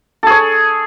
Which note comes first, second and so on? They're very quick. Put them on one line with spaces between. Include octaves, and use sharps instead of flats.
A4 G#4 C#5